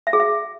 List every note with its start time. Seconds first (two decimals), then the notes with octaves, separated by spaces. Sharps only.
0.07 E5
0.13 G#4
0.19 E5